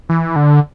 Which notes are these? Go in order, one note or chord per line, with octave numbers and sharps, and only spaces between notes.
E3
D3